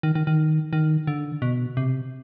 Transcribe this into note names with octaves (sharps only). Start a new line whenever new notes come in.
D#3
D#3
D#3
D#3
D3
B2
C3